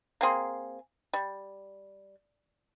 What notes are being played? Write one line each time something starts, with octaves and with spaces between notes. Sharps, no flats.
A#3 C4 G#4 C6
G3